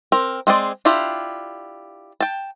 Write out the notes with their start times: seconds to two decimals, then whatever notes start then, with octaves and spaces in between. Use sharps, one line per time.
0.12 C4 A#4
0.47 G#3 C4 G#4 D5
0.85 D4 E4 F4 G4 A#5
2.21 G5 A5